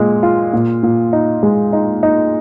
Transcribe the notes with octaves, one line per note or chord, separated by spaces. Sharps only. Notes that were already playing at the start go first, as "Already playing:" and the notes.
Already playing: A#2 G#3
F4
A#2
A#2
D#4
G#3
D#4
D#4